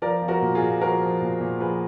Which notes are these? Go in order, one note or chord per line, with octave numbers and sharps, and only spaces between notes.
F3 A#4 D5
F3
F#4 A#4
A#2
F4 G#4
A#2
F3 F#4 A#4
F3
A#2
A#2
F3 G#4 B4